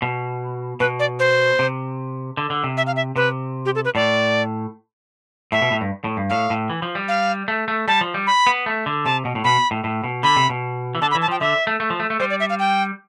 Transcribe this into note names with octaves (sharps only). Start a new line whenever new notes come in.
B2
B2 B4
D5
C5
C3
D3
D3
C3
E5
F5
E5
C3 B4
G4
A4
B4
A2 D5
A2 E5
B2
A2
G2
A2
G2
A2 F5
A2
E3
F3
G3
F5
A3
A3
G3 A5
F3
G3
B5
B3
A3
D3
C3 A5
B2
A2
B2 B5
A2
A2
B2
D3 B5
C3
B2
E3
D3 A5
B5
E3
A5
F3 G5
D3 E5
A3
A3
F3
A3
A3
G3 C5
D5
E5
F5
G5